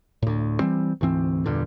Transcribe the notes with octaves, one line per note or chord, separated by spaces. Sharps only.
D2 A2
E3 G3 C4
D2 G#2 E3 C4
E2 G2 A#2 D3